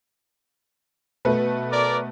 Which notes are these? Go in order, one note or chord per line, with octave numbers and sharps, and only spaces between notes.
B2 A3 B4
A#4 D5